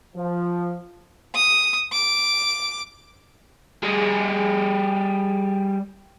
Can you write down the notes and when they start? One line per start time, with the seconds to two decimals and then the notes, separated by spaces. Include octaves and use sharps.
0.16 F3
1.35 D#6
1.92 D6
3.83 G3 G#4